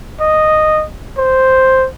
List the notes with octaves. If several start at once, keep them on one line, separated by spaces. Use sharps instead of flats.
D#5
C5